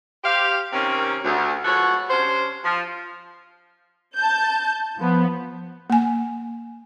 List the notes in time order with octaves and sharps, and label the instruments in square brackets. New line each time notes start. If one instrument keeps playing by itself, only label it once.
[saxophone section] G4 C5 F5
C3 D#3 A#3 C4 C#4
D2
F3 G#3 B3 F#4 A4 C#5
C3 C#4 D4 C5
F3
[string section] A5 G6
F3 B3
[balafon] A#3 G#5